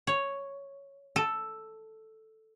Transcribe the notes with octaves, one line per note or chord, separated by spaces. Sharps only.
C#5
A4